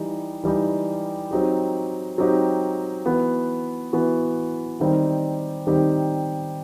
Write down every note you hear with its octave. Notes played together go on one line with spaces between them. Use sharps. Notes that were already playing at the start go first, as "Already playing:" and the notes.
Already playing: E3 G3 D#4
E3 G3 D#4
F#3 C4 D#4 G4
F#3 C4 D#4 G4
E3 B3 F#4
E3 B3 F#4
D#3 G3 C4 D#4 G4
D#3 G3 C4 D#4 G4